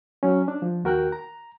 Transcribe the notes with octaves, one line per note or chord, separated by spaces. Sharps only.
F#3 C#4
D4
F3
D#2 F#4 A#4 G5 F#6
A#5